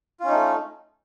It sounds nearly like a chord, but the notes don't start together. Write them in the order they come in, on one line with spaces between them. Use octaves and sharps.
F4 C#4 D#4 A3